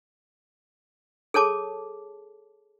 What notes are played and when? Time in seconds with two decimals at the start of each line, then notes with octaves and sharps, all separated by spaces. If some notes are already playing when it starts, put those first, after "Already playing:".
1.34 G#4 A4 C#5 A5 D6